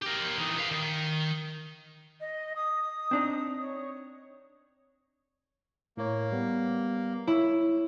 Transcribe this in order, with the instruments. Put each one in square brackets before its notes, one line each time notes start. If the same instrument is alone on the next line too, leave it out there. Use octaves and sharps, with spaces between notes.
[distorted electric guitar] G4 A#4
E3 D#4
B4 F5
D#3
[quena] D#5
D#6
[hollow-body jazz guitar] C4 D4 D#4
[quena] C#5
[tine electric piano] A2 C#5 [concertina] A#3
[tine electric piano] G3 B3
[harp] E4 [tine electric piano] C#5